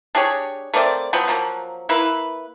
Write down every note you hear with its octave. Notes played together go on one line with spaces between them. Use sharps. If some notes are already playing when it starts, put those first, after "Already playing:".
D4 G4 G#4 C#5
A3 A#3 C4 D5
F3 F#3 B3 C4
F3 F#3 A#3
A#3 E4 B4